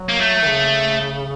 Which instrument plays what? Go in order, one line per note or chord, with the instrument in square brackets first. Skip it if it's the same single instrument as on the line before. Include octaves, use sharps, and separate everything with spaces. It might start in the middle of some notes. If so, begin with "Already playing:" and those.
Already playing: [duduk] F#3
[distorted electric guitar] A#3
A3
[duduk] D#3
C#3